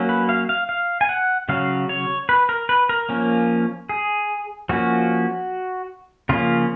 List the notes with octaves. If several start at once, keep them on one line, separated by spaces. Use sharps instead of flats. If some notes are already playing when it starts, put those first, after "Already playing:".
Already playing: F#3 A#3 C#4
B4
F5
F5
F5
G#5
F#5
C#3 F#3 C#4 F5
C#5
B4
A#4
B4
A#4
F3 A#3 C#4
G#4
F3 A#3 C#4 F#4
C#3 F3 A#3 C#4 F4